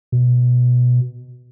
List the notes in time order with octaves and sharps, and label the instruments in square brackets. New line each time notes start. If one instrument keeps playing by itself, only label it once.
[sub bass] B2